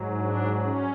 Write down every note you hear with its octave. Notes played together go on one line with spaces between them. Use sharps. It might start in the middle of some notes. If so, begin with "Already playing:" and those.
Already playing: G#2 F#3
D4
C#4